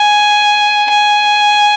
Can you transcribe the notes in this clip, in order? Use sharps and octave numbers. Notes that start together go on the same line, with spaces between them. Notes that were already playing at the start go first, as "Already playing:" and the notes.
Already playing: G#5
G#5